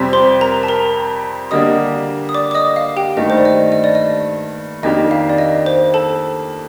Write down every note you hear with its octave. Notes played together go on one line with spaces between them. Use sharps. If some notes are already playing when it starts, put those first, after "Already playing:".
Already playing: F2 C3 G3 C4 G4
C5 C6
A#4 A#5
A5
A#4 A#5
D3 G3 A#3 D4 G4 D#5 D#6
D#6
D5 D6
D6
D#5 D#6
F5
G4 G5
G2 D#3 A3 D#5
C5
D5
D#5
D#5
D5
D#5
F2 D#3 A#3 D4 G4 D#5
F5
D5
D#5
C5
A4 A5